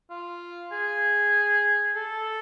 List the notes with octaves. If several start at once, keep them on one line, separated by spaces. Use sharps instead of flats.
F4
G#4
A4